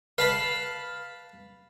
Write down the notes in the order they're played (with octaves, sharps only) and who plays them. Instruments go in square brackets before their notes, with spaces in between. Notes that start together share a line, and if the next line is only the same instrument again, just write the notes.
[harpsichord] B4 A5 B5 [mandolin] F5